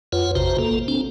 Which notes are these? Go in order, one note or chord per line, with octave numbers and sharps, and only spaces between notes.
F2 F4 B4 C#5 F#5
A1 C3 F#4 C5 A#5
A#3 A4
C4 D4